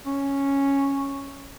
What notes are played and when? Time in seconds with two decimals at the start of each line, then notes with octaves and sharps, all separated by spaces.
0.06 C#4